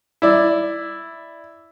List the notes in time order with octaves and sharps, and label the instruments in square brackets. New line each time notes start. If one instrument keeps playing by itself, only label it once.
[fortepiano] E4 D5